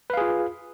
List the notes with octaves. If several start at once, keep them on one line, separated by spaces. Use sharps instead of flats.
F4 G#4 B4 F5